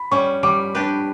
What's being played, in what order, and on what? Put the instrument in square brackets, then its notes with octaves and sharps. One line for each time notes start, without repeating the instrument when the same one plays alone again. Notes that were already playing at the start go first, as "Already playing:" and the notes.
Already playing: [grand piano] B5
[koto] G3 C#4 [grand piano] C#6
[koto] G3 [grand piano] D6
[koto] D4 G4 B4